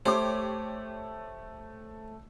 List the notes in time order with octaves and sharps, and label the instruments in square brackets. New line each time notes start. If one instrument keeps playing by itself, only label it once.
[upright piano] A3 [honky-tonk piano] G4 C#5 D6 [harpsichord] C5